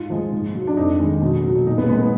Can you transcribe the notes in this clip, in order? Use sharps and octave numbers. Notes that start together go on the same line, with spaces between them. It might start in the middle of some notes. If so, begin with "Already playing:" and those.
Already playing: G#2 F4
F3 G#3
G#2
F#3
D4
F2 D#4
D#3 G#3
B2
F#3
A#2 D#4
B3
G#3 B3
B3